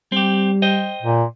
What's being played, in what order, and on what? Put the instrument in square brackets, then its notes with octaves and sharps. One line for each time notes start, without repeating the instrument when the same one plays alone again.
[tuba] G3 [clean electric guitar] C4 G4
[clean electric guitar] C5 D#5 G5
[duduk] A#2